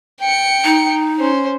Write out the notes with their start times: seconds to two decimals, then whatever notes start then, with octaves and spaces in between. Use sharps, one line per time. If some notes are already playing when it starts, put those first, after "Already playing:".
0.20 G5 C#7
0.65 D#4
1.19 C#4 C5